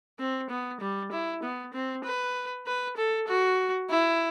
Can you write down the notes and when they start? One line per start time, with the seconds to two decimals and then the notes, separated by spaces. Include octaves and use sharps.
0.19 C4
0.50 B3
0.81 G3
1.12 E4
1.43 B3
1.73 C4
2.04 B4
2.66 B4
2.97 A4
3.28 F#4
3.90 E4